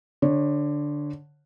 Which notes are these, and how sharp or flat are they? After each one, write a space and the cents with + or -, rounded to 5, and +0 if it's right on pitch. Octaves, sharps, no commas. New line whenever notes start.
D3 +0 C#5 -20